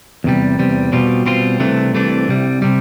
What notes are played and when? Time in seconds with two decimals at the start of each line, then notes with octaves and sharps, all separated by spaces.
0.24 E2 C3 G3
0.59 E2 C3 G3
0.92 B2 G3 C4 F4
1.26 B2 G3 C4 F4
1.60 C2 C3 E3 A3 D4
1.93 C2 C3 E3 A3 D4
2.28 C2 C3 G3
2.62 C3 G3